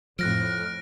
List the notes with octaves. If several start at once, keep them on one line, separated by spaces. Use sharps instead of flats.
F2 A2 F3 F6 F#6 A#6 D7